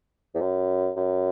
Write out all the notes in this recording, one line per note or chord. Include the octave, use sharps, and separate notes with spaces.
E2
F#2
F#2